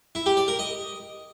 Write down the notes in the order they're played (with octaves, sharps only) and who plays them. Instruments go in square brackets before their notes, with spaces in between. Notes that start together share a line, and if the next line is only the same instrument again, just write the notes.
[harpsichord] E4
G4
D5
A#4
D#5